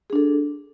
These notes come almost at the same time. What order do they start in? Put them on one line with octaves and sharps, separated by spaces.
G#4 D4 A4